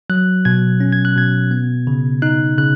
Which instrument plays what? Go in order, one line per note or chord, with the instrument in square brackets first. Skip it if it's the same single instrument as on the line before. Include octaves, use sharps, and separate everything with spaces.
[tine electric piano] F#3 F#6
B2 G#6
C#4
G#6
F#6
B2 G#6
B3
C#3
D#4 F#6
C#3 F#6